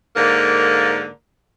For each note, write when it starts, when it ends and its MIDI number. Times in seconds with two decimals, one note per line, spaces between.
0.16 1.08 44
0.16 1.08 50
0.16 1.08 58